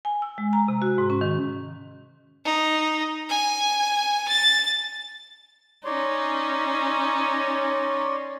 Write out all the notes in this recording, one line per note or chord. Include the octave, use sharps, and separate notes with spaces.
G#5
E6
G#3
A#5
C3
F#4
G#2
C#4
D#3
D#4
G#5
A6
C#4 D#4 C#5 D5 C6